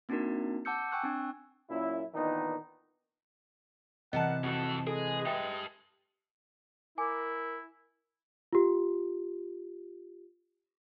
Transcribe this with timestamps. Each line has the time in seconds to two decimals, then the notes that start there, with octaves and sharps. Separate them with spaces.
0.09 A#3 C4 D4 D#4 F#4 A#4
0.65 F#5 A5 D6 E6 G6 C#7
0.92 G5 G#5 C#6 E6 F#6
1.03 C4 D4
1.70 F#2 A#2 C#4 E4
2.14 A#2 D#3 E3 B3 D4 D#4
4.13 C3 E3 A#4 D#5 F#5 A5
4.44 F2 F#4 A4
4.87 G#3 G#4 A4 B4 D#5
5.26 G4 E5 G5 A5
6.98 E4 A#4 G#5 D6
8.53 F4 G4